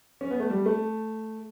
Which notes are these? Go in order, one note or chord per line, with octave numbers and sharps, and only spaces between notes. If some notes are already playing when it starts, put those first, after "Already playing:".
C#4
B3
A3
G3
A3